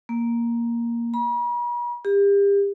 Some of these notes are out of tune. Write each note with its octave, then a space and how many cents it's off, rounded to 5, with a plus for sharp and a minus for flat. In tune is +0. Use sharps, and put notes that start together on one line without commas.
A#3 +5
B5 -45
G4 +35